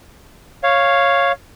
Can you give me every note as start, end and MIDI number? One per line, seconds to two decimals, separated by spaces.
0.63 1.32 73
0.63 1.32 77